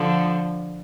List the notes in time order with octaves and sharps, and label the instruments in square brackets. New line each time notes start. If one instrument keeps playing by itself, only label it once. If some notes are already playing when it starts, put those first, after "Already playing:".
Already playing: [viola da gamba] D3 F3